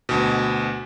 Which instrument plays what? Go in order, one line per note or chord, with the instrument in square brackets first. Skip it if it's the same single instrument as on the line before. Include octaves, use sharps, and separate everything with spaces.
[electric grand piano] D2 B2